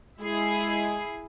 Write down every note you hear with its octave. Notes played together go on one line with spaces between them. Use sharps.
G#3 E4 G#4 C7